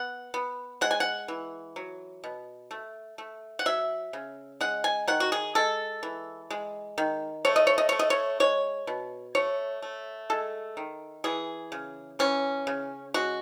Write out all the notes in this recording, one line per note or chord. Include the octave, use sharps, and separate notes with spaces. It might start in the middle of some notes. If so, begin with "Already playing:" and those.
Already playing: B3 F#5
B3
G#3 F#5
G#5
F#5
E3
F#3
B2
A3
A3
F#5
F#3 E5
C#3
G#3 F#5
G#5
D#3 F#5
F#4
G#4
G#3 A4
E3
G#3
D#3
A3 C#5
D#5
C#5
D#5
A3 C#5
D#5
C#5
G#3 C#5
B2
A3 C#5
A3
G#3 A4
D#3
E3 G#4
C#3
E3 C#4
C#3
G#3 F#4